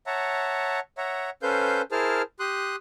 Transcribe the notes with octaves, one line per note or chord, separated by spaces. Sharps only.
C#5 E5 F#5 A5 A#5
C#5 E5 F#5 A#5
C#4 A4 B4 C5 F5 G6
E4 G#4 A#4 C5 A5 F6
G4 C6 D#6 F#6